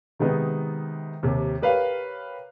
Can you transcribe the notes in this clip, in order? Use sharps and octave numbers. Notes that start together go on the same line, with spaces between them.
C3 D#3 G#3 B3 D#4
D#2 C3
G4 A#4 B4 C#5 F5